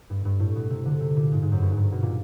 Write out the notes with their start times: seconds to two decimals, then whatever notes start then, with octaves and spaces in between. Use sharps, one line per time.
0.10 G2
0.25 G2
0.40 A2
0.56 B2
0.70 C3
0.86 D3
1.00 C3
1.16 A#2
1.32 G#2
1.42 G#2
1.52 F#2
1.62 G2
1.71 G#2
1.77 G2
1.92 B2
2.02 A#2